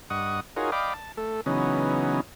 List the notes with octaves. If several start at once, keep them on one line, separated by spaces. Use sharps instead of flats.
G2 D#5 F#5 C#6 D#6
D#4 F4 F#4 G#4 A#4 C#5
D5 D#5 F5 G5 B5 D6
A5
A3 A4
C#3 E3 F#3 B3 C#4 D#4